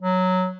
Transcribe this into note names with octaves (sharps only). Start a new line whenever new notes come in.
F#3